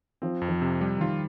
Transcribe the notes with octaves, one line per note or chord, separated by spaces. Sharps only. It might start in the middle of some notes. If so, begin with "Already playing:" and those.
F3 C4
F2
F3
C3
G3
D#3
F3 F4